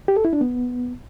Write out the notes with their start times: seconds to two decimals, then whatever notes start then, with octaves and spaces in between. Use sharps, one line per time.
0.08 G4
0.16 A4
0.25 E4
0.33 D4
0.41 B3